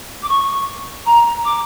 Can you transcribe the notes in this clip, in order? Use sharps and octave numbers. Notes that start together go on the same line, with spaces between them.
D6
C#6
A#5
D6